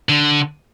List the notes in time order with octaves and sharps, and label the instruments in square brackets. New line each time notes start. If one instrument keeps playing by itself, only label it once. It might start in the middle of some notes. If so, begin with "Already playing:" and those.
[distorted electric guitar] D3